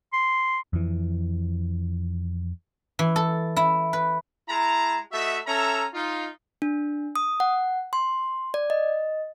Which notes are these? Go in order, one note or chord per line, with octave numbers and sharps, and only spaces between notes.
C6
F2 E3
E3
A4
E4
B4
G#3 E4 A5 A#5
A3 F#4 D#5 E5
C#4 A4 E5 A#5
D#4 F4
D4
D#6
F#5
C6
D5
D#5